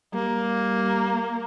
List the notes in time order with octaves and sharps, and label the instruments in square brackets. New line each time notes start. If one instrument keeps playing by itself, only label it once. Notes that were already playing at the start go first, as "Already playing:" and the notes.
[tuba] G3 [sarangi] A#3